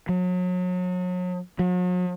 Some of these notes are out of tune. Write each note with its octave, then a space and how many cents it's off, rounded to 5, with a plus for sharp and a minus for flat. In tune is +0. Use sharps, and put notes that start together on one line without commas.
F#3 -35
F#3 -45